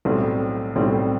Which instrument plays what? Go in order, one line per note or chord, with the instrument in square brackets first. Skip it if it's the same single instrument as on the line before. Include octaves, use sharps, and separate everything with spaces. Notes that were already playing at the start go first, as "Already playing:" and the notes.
[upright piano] B1 A2 G3 C4
B1 A2 G3 C4